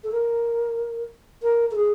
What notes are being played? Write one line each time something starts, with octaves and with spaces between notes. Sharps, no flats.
A4
A#4
A#4
A4
G#4